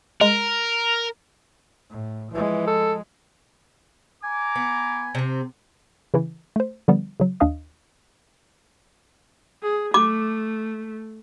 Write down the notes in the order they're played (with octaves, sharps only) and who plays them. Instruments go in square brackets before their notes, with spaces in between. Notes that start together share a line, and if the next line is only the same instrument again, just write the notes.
[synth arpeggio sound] G#3 [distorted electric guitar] A#4
[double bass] A2
[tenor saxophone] E3 [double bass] F3 G#3
[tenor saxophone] A4
[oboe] G#5 [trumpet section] A#5 D6
[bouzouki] B3
C3 C4
[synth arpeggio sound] C#3 E3 E4
A3 C5
D3 F3 G3 B3
C#3 F#3
D#2 D4 D#5 F5 D#6
[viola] G#4
[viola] A3 [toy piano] D6